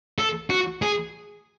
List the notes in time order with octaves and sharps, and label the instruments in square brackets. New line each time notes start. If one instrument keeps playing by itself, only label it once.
[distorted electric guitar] A4
F#4
G#4